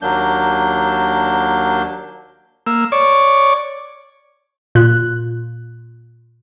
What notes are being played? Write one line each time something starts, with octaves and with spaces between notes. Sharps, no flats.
D#2 F#3 A#3 D4 G6
A#3 E6
C#5 D5
A#2 F4 F#6